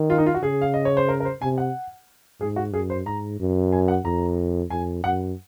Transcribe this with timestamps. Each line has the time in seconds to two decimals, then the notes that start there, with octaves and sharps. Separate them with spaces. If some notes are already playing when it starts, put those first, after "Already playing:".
Already playing: D#3
0.10 F4
0.18 D#4
0.26 F4
0.34 F#4
0.42 C#3 G#4
0.61 F5
0.74 D#5
0.85 C#5
0.97 C5
1.09 A#4
1.20 A#4
1.25 C5
1.42 C3 G#5
1.58 F#5
2.41 G#2 G#4
2.56 F#4
2.73 F#2 G#4
2.90 C5
3.05 G#2 A#5
3.39 F#2
3.72 G#5
3.88 F#5
4.05 F2 A#5
4.70 F2 G#5
5.04 F#2 F#5